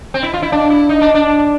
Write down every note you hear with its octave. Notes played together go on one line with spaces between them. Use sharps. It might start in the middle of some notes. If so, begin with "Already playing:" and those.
C4
E4
F4
E4
D4
E4
D#4
D4
D4